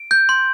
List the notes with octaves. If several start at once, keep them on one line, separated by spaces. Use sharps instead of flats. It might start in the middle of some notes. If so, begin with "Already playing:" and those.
Already playing: D7
G6
C6